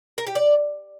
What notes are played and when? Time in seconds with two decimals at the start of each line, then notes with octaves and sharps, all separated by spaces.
0.18 A#4
0.27 G4
0.35 D5